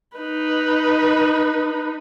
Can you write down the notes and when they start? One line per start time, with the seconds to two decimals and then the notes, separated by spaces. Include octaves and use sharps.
0.17 D#4 B4